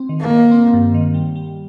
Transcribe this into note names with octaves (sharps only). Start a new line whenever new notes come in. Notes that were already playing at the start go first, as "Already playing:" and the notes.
Already playing: C4
D#3
A#3
D#3
C4
G2
D#3
G3
G3